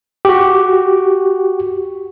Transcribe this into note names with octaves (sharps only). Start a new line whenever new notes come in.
F#4 G4